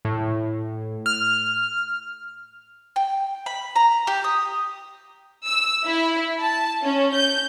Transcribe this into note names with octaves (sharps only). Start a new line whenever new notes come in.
A2
F6
G5
B5
A#5
G4
D#6
E6
E4
A5
C#4
G6